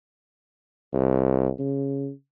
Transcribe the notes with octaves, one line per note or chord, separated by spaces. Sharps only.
C2
C#3